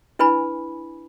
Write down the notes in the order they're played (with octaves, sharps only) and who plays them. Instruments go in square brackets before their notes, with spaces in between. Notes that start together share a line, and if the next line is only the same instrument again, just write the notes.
[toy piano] D4 E4 B4 G#5 B5